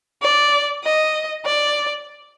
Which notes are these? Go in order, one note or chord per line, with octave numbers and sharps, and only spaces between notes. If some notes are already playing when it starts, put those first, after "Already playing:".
D5
D#5
D5